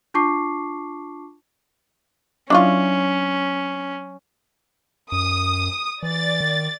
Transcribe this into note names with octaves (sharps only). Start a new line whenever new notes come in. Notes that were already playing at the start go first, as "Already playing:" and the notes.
D4 F4 A5 C#6 D6 C7
F#3 C#4 D4 E4 F4 C#6
F#2 D#6
E3 D5 A6
D#3